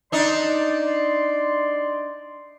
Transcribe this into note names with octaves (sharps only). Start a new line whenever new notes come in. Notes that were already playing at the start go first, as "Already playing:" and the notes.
D4 D#4 D5 C6